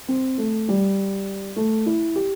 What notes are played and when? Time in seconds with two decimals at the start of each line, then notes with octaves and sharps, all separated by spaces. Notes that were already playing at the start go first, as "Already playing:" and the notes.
0.08 C4
0.38 A3
0.68 G3
1.56 A3
1.86 E4
2.16 G4